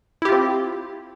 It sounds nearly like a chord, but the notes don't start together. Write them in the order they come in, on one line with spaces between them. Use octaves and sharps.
E4 G4 F4 C4